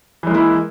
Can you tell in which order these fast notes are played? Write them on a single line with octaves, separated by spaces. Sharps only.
E3 G#3 A#3 E4